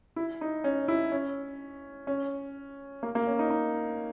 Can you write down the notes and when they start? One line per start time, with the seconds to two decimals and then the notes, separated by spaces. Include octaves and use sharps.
0.16 E4
0.41 D#4
0.64 C#4
0.88 E4
1.12 C#4
2.07 C#4
3.03 A#3
3.15 A#3
3.27 C#4
3.39 D#4
3.50 D#4